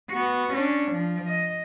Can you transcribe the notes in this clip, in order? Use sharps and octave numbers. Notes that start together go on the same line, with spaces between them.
B3 F#4
C#4 D4
F3
D#5